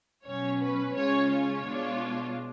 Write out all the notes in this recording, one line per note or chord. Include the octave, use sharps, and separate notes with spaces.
B2 F#3 C#4 C#5
B4
C#3 G#3 C#4 F4 C#5
C#5
B2 G#3 D4 F4